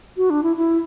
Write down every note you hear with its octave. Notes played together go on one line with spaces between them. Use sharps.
F#4
D4
E4
E4